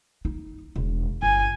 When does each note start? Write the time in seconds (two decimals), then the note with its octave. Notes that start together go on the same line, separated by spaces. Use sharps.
0.25 D#4
0.76 E1
1.22 G1 G#5